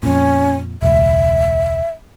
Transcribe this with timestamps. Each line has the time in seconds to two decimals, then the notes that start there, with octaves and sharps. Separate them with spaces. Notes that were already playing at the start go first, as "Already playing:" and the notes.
0.03 F2 A#2 C#4
0.82 E1 C#2 E5